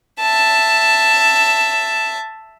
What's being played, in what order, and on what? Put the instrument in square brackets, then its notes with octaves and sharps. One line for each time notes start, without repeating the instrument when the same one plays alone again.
[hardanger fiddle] E5 A5